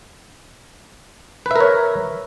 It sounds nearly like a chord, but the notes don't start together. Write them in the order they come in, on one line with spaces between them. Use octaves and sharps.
B4 E5 A#4 C#5